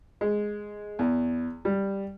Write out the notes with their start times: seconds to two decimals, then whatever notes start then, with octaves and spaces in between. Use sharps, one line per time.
0.21 G#3
0.99 E2
1.65 G3